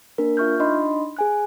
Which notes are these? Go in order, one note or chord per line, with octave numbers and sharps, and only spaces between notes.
A#3 D4 A#4
F4 E5 C#6 F6 G6
D4 D#4 D#5 B5 C6
G#4 G#5 F#6